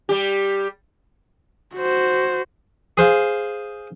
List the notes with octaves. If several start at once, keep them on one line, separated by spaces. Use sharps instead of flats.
G3 G4
F#4 C5
G#4 C5 F5